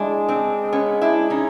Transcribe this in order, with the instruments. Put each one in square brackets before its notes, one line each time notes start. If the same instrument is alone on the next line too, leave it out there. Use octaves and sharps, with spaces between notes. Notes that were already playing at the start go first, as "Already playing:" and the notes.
Already playing: [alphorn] G#3 [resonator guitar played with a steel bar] D4 E4
[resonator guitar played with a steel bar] C4 D4
B3 C#4
D4 E4
C#4 D#4